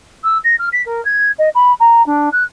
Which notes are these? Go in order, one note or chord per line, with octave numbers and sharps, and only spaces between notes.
E6
A#6
F6
B6
A#4
G#6
D#5
B5
A#5
D4
F#6